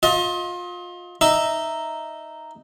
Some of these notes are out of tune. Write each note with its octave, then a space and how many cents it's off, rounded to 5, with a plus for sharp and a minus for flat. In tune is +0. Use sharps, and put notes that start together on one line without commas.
F4 +25 D#5 +35
D#4 -5 E5 +0